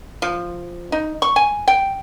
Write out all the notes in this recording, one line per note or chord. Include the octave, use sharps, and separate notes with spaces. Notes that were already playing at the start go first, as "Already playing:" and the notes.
F3
D#4
C#6
G#5
G5